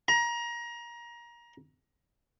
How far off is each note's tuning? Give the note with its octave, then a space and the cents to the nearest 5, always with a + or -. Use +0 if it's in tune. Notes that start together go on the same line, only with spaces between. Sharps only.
A#5 +25